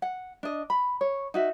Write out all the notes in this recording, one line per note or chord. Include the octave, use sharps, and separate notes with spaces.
F#5
D4 D#5
B5
C#5
D#4 F#4 E5